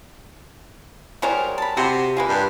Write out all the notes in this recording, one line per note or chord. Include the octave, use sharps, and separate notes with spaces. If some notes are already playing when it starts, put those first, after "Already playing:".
F#3 G3 G#4 A#4 C5 C#5
A5 B5
C3 F#4 G#4 C6
G#3 A#3 F4 G#4 B4
G2